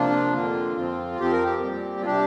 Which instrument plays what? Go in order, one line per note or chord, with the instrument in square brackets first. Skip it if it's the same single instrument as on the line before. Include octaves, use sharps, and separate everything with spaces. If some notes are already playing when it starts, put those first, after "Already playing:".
Already playing: [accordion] C3 F3 A#3 D4 F4
F2 D3 A#3
F2 F3 C4
F2 F3 C4 G4
A#4
G4
A#2 G3 C4
F4
C3 G3 D4 G4